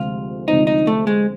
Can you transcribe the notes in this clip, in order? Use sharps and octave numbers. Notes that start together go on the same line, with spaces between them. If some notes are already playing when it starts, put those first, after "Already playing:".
Already playing: D2 C3 F3 G#3 C4 F4
D2 C3 F3 G#3 C4 D#4
D#4
A3
G#3